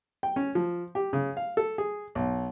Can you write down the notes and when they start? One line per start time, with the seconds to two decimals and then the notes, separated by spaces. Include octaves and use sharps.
0.23 G5
0.36 C#4
0.55 F3
0.95 G4
1.13 C#3
1.37 F5
1.57 A4
1.78 G#4
2.15 B1